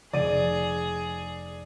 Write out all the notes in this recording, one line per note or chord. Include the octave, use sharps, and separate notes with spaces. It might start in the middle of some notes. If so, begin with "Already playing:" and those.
F1 G#4 D5 D#7